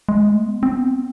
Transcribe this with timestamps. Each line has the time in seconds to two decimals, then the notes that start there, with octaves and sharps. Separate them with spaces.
0.09 G#3
0.28 A3
0.46 B3
0.63 C4
0.75 B3